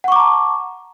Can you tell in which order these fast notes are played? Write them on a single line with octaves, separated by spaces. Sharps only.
F#5 C#6 D6 A#5 A5